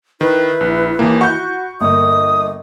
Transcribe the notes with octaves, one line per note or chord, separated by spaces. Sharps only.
D#3 E4 B4
A#1
D#2 E3 A#3
F#4 F#5 B5 C#6 G6
G1 A#3 D#5 D#6